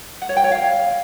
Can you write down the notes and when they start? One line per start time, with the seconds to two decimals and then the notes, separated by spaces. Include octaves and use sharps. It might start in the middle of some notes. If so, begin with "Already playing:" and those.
0.22 F#5
0.29 C#5
0.37 G5
0.44 C#5
0.52 F5